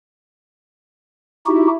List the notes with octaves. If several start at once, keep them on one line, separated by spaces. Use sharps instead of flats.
D#4 E4 F#4 G4